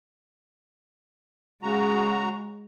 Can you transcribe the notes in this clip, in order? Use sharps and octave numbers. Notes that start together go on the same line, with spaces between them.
C#3 G#3 F#4 A#5